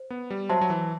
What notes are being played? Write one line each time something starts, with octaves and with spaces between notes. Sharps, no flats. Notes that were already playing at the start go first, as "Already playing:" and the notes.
Already playing: C5
B3
G3
F#3 C5 E5 A5 C6
F#3
E3